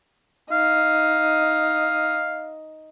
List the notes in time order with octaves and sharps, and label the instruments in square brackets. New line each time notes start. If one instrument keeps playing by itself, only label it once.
[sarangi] D#4 [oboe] F5